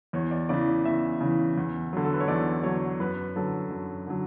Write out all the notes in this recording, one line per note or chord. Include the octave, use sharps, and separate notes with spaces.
E2 C#5
D5
C#3 E3 D5
E2 E5
C#3
E3
E2
D3 F#3
A4
B4
C#5
E2 D5
D3 F#3 C#5
F#2 B4
D3 F#3 A4
F#2
D3 F#3